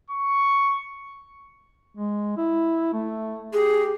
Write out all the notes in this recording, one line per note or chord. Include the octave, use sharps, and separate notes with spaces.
C#6
G#3
E4
A3
G4 G#4